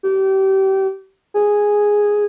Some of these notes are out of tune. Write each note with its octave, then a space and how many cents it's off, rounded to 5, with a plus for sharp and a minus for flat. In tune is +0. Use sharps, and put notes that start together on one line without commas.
G4 -30
G#4 -5